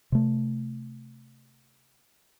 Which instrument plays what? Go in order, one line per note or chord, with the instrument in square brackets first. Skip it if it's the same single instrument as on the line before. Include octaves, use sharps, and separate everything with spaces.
[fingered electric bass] C3 A3